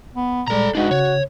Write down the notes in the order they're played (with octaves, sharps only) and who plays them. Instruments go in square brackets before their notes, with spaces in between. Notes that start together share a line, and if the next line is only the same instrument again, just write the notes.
[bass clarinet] B3
[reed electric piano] A#2 G#3 [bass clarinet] G3 [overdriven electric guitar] A4 A#5
[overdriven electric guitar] G#3 D4 [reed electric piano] D#4 D#5 [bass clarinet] F#4
[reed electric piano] C#3 [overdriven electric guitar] C#5